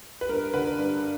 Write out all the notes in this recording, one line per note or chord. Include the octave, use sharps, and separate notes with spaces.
B4
G2 A#4
D3 B4
G2